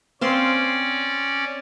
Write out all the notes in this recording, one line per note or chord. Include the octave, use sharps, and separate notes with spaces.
C4 C#4 D5 F5 C6